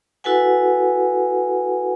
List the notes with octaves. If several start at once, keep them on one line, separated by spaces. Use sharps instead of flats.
E4 F#4 A4 B4 F#5 G#5